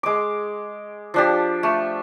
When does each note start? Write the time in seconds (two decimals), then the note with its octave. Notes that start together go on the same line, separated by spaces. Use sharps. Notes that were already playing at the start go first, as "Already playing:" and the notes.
0.03 G#3 D6
1.14 F3 D4 G4
1.63 A3